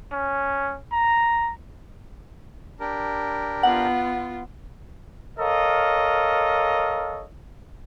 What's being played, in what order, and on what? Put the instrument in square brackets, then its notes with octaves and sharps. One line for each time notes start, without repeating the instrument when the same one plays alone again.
[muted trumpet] C#4
A#5
[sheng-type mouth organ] D4 G4 A#4
[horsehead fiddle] B3 F4 [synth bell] F#5
[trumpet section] A4 A#4 C#5 D#5 F5